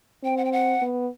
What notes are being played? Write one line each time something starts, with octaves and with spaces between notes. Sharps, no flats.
C4 G5
F#5
G5
F#5
B3